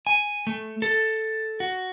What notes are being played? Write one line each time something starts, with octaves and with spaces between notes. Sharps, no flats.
G#5
A3
A4
F#4